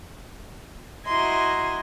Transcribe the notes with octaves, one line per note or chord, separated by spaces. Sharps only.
E4 F#4 D#5 G#5 A#5 C6